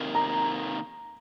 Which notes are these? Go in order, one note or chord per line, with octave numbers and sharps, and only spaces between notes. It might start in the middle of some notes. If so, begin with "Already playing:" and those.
Already playing: C3 D#3 A#3 D#4
A#5